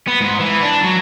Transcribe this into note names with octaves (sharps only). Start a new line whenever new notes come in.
B3
G#2
E3
D4
F#3